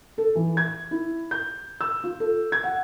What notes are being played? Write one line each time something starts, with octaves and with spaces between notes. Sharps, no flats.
A4
E3
G#6
E4
G6
E6
F4
A4
G#6
F#5